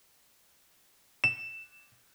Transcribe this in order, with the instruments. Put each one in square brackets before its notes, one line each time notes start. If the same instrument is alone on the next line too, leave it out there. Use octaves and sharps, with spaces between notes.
[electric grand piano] E7